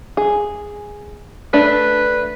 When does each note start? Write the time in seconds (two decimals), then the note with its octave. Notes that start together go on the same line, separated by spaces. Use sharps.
0.17 G#4
1.53 A3 D4 B4